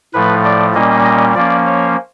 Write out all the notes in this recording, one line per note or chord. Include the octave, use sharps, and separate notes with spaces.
A2 F3 A3 B4
D5
A#2 G3 A#3 C#4 D#5
D#5
F3 A#3 C#4 D5
C#5